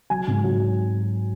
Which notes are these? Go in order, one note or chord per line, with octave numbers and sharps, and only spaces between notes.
F#3 G#5
G#2
F#3